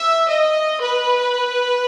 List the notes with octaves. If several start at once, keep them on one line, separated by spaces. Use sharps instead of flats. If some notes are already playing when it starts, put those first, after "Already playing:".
Already playing: E5
D#5
B4